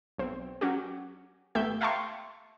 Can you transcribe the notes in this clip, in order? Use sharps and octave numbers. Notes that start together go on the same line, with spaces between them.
B1 C4
F#3 C#4 F#4 G4
G#1 A3 B3 G4 E5 G6
E5 F5 G5 A5 C6 C#6